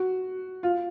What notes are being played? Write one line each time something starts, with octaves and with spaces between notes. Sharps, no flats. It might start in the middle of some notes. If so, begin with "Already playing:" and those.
Already playing: F#4
F4